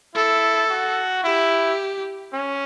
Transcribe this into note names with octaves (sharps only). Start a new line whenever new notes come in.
E4 A4
F#4
E4 G4
C#4